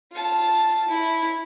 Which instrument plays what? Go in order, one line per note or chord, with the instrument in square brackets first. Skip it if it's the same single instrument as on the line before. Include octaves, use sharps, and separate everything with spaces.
[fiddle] F4 A5
E4